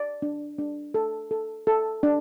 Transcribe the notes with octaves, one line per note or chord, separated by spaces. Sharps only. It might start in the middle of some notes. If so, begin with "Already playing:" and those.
Already playing: D5
D4
D4
A4
A4
A4
D4